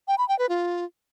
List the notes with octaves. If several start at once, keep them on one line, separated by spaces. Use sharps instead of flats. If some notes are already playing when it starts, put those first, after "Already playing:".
G5
B5
G5
B4
F4